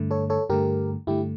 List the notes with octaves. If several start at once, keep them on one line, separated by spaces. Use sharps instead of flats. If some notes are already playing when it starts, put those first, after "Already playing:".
Already playing: G2 D3 A3
A4 C#5
A4 C#5
G2 D3 A3 G4 A#4
G2 D3 A3 E4 G4